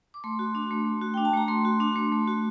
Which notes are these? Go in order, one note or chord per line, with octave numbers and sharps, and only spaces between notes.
D6
A3 C6
F#4
D4
A3
A3
F#4
D4 G5
A5
A3 A#5
A3 C6
F#4
D4
A3
A3
F#4